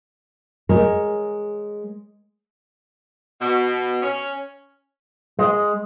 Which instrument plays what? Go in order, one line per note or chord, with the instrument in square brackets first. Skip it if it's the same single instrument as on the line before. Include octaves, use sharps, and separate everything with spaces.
[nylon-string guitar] G#3 A#4 C#5
[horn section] B2
C#4
[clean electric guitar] G#3